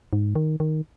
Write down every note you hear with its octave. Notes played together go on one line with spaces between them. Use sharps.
G#2
D#3
D#3